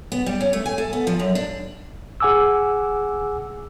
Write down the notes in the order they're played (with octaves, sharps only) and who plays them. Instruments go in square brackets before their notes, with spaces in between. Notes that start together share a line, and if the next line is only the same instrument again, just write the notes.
[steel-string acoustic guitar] B3
G3
C#4
A3
G#5
A4
B3
F3
F#2
D4
[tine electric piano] G#4 F#5 G#5 D6 E6